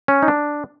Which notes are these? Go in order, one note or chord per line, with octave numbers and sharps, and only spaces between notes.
C#4
D#4
D4